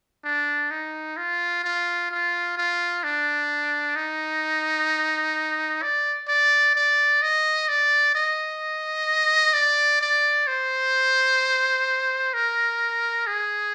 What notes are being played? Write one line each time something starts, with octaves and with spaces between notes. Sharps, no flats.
D4
D#4
F4
F4
F4
F4
D4
D#4
D5
D5
D5
D#5
D5
D#5
D5
D5
C5
A#4
G#4